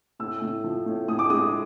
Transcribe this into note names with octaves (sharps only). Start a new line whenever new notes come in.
A2 E6
A2
F3
A2
A2 D#6
D6
G#3 D#6